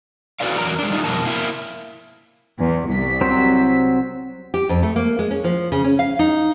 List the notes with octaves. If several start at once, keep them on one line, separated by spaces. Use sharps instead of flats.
E4 F#4 A4 B4 D5 F5
E2 F#3 A#4 A#5
G#3 D4
G3 A3 D#4 F4
F2 B2 F3 B3 A#4 A5
A#3 E4
E2
C2 B6
F#3 C4 C5
G4
F2
A3
A#3
G#3
C#4
F3
C#3
C#4
F5
D#4